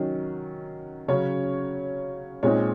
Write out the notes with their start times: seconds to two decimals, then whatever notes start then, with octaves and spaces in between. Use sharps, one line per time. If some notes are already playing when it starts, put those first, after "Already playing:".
Already playing: D#3 F#3 C#4
1.08 C#3 F#3 C#4 C#5
2.43 A#2 G#3 C4 D#4 C#5